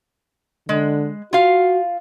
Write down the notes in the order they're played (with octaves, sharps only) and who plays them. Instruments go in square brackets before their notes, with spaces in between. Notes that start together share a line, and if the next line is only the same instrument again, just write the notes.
[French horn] D3 [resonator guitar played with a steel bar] G#3
[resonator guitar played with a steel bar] F4 F5 [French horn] F#4